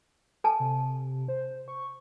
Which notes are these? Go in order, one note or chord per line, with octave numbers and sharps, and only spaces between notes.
A4 G#5 A5
C3
C5
C#6